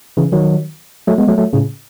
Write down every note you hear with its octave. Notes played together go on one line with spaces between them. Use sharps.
C#3 E3
D#3 F#3
F#3 A3
G#3 B3
F#3 A3
F#3 A3
A2 C#3